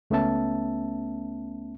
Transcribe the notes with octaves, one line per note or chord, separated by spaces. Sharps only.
C#2 A3 B3 C#4 E5 A5